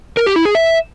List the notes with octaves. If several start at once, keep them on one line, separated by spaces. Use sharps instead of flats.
A#4
G4
E4
G#4
E5